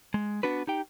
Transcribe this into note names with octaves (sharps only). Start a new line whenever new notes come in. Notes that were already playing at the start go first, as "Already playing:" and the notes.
G#3
B3 D4 F#4 B4
D#4 G4 G5